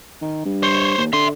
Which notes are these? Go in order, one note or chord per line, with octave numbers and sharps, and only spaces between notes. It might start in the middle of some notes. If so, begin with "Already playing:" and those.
D#3
G2
C5 C#5
D#2
D3 E5 C6